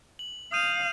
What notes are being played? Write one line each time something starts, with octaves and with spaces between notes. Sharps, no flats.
F#7
F5 D#6 G6 D#7